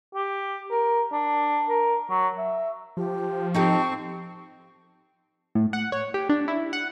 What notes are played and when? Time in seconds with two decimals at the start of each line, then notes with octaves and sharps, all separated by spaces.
0.15 G4
0.71 A#4
1.12 D4
1.69 A#4
2.10 F#3
2.38 E5
2.97 F3 G4
3.54 C4 D#4 G4 A4 G5 C#6
5.55 A2
5.73 F#5
5.92 C#5
6.14 G4
6.29 D4
6.48 E4
6.73 F#5